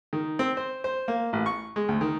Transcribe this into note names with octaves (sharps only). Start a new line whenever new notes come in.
D#3
C4
C5
C5
A#3
A1
C#6
G#3
D2
D#3